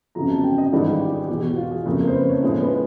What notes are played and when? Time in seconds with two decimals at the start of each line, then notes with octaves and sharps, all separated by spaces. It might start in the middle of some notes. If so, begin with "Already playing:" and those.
0.15 G1 F2 C#3 F#3 A#5
0.30 A5
0.44 G5
0.58 D#5
0.72 G#1 G#2 E3 G3 A4
0.86 F4
1.00 G4
1.14 G#4
1.28 E1 E2 B2 G4
1.43 F#4
1.57 F4
1.71 G#4
1.85 F#1 F2 C#3 A4
2.00 A#4
2.07 C5
2.14 B4
2.29 C#5
2.42 B1 A2 F3 G#3 C#5
2.62 B4